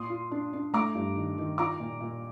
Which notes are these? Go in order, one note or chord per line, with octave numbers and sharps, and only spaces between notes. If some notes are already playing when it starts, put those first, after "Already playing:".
Already playing: A#2 C6 D#6
F4
D4
D4
A3 A#5 D6
G2
D#3
D#3
F4 A#5 D6
A#2
A#2